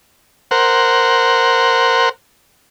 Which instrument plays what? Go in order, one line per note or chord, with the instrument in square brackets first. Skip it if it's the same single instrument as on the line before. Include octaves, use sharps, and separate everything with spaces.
[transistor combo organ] A#4 C5 F#5